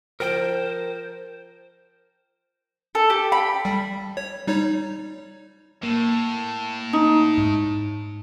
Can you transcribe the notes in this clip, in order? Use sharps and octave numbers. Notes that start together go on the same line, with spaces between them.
F3 A#4 C5 G5
A4
G4
B5
G3
C#5
G3 D#4 C#5
A2 A#3
D#4
G#2